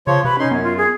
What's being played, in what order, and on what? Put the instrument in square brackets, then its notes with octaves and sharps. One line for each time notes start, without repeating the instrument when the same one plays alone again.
[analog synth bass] C#3 [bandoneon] F3 C#5 [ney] C6
[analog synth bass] C3 [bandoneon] B4 [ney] B5
[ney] C#4 [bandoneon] D#4 C6
[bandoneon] F#2 [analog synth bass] B3
[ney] F4
G#4